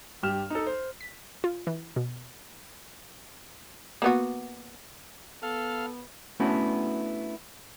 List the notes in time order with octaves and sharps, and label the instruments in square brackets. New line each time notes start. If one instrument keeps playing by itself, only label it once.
[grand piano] G2 G4 F6 E7
D#4 A4
C5
[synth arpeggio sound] B6
F4
E3
B2
[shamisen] A#3 B3 F#4
[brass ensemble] B3 [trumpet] A4 [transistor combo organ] F5 F6
[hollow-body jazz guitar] A3 B3 C#4 D4 E4 F#4